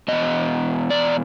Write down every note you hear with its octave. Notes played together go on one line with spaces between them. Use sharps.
E2 B2 D#5
D5